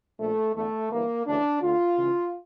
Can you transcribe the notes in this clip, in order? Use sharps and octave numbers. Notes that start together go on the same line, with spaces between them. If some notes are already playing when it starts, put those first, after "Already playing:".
A#1 A#2 A3
E2 D3 A3
G1 G2 E3 A#3
D2 C#3 E3 D4
D2 D3 F4
C#2 C#3 E3